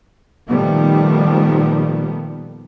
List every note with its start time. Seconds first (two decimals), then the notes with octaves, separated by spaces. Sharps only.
0.48 A#2 D#3 F3 G3 A3 B3